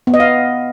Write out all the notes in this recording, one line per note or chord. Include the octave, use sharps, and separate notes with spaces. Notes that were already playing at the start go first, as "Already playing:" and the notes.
B3
D#5
F5